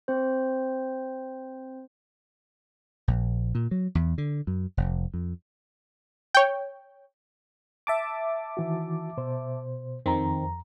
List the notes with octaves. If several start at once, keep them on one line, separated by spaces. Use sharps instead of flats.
C4 C5
A#1
A#2
F#3
E2
D3
F#2
F1
F2
C#5 G5
E5 A5 D6
D#3 E3 F#4
B2 C5
F2 D#3 C4 A#5